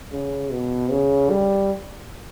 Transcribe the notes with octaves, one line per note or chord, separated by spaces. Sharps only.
C#3
B2
C#3
G3